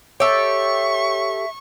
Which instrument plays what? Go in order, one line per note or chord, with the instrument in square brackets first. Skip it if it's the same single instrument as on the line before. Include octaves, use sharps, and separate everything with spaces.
[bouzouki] G4 A4 [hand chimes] C#5 [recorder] E5 [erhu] C#6